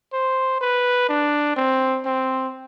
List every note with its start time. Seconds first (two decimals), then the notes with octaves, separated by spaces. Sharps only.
0.13 C5
0.61 B4
1.09 D4
1.56 C4
2.05 C4